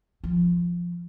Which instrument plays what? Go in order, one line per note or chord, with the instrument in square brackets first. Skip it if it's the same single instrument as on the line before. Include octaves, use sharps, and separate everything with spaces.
[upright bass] F3